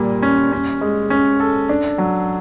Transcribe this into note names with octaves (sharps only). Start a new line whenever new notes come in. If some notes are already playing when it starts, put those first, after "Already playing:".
Already playing: A#2 G3 A#3
C#4
C#4
G#3
C#4
A4
D4
F#3